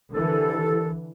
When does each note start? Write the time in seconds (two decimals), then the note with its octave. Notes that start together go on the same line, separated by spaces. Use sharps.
0.13 C2 D3 E3 A4